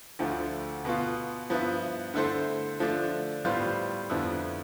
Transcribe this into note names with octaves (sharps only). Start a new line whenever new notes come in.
D2 D3 F3 A3
B2 B3 F4
G2 F3 B3 E4
D3 A3 E4 A4 C5
D3 F3 A3 D4
A2 G3 B3 F4 C5
F2 D3 F3 B3 E4